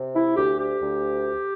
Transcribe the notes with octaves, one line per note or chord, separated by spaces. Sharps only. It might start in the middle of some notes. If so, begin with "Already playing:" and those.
Already playing: C3
E4
D2 G4
G4
D2